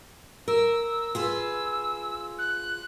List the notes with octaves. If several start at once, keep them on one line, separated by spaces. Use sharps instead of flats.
A#4 E6
F4 G#4 B4 E6
F#6